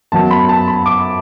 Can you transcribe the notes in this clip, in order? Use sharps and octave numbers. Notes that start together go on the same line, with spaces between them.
F#2 F#3 B3 A5
B5
A5
B5
D6